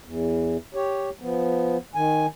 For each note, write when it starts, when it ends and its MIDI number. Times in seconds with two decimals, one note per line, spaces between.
0.05 0.57 40
0.75 1.10 67
0.75 1.10 73
1.21 1.77 53
1.21 1.77 59
1.95 2.26 51
1.95 2.26 80